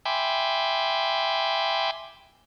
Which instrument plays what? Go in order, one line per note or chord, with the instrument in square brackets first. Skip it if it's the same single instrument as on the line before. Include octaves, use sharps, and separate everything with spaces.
[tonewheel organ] E5 G5 G#5 B5 C6 D6